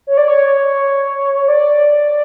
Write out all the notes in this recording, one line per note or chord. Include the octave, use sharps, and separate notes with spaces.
C#5
D5
C#5
D5